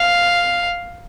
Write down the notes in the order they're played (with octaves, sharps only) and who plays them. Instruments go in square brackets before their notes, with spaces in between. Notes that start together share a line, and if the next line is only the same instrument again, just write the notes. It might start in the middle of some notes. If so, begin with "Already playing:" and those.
Already playing: [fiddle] F5